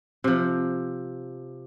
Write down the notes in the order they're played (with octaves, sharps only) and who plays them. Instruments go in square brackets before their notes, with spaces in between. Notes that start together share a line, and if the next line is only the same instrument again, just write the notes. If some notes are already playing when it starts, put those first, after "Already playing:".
[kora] C3 F3